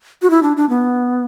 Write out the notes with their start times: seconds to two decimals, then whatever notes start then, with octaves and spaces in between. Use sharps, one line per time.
0.22 F#4
0.30 E4
0.43 D4
0.57 D4
0.69 B3